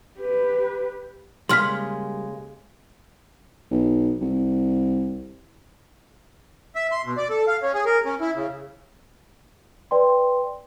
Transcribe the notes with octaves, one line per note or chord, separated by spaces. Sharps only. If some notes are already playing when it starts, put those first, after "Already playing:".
G4 B4
C#3 G3 G#3 A#3 C6 F6 B6
B1
C2
E5
C6
B2
D5
A4
F5
C#4
G#4
A#4
C#4
E4
C#3
B4 D5 G5 C6